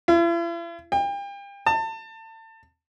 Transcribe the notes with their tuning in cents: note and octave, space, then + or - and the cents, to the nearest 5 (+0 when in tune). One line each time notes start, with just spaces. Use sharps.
E4 +45
G5 +35
A5 +30